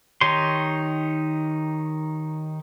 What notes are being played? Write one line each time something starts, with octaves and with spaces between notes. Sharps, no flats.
D#3 D#4 G4 C#5 C6